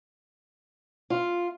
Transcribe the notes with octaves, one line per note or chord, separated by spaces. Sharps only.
F4